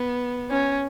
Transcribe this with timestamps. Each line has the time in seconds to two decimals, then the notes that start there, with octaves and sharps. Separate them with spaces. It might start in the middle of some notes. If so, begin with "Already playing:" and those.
Already playing: B3
0.51 C#4